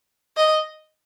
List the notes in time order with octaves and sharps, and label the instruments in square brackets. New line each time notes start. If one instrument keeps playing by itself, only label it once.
[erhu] D#5